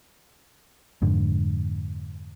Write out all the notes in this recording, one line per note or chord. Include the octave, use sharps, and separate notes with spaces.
F2 G#2 D3